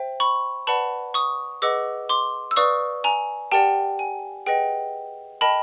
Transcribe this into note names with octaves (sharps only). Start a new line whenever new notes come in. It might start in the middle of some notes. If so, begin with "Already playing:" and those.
Already playing: C5 E5 G5
B5 C#6
B4 D5 F#5 A5 B5
C#6 D#6
G#4 B4 D#5 F#5 D6 E6
C6 D6
E6
B4 D5 F5 C#6 D#6
G#5 A#5
G4 A#4 D5 F#5 G5 A5
G#5
G#4 B4 D#5 F#5 G5
A#4 D#5 G5 A5 B5